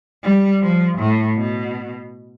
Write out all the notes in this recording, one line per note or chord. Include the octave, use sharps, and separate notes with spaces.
G3
F3
A2
B2